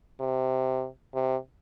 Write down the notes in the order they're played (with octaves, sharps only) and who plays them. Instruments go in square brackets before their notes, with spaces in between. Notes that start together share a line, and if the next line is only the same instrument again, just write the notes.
[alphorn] C3
C3